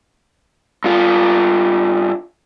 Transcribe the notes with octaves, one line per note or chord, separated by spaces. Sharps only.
G2 F4